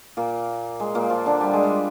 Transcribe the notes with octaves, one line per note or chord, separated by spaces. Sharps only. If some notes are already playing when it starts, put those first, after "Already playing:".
A#2 A#3
G#3
A#2 A#3
F3 F4
D3 D4
G3
G#3
G3